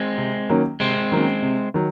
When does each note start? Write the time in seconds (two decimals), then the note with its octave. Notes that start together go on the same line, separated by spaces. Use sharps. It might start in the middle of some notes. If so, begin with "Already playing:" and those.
Already playing: G#3 C4
0.18 C3
0.49 D#3 F#3 A#3 C#4
0.80 C3 G#3 C4
1.12 D#3 F#3 A#3 C#4
1.42 C3
1.74 D#3 F#3